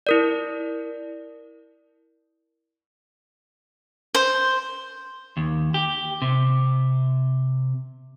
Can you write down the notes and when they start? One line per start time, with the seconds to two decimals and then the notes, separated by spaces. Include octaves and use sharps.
0.07 E4 A#4 D5
4.15 C5
5.37 D#2
5.74 G4
6.22 C3